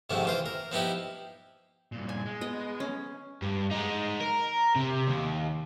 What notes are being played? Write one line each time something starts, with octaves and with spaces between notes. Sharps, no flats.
G#2 C3 D#3 F3 A3
E3 F4 C5
A#4
F3 B3 D#4 E4 G4
G2 A#2
G#5
G#3
B3 D#5
C#4
G2
G#3 D#4
A#4
C3
D#2